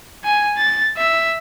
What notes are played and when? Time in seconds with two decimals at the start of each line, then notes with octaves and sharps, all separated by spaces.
0.24 G#5
0.58 A6
0.97 E5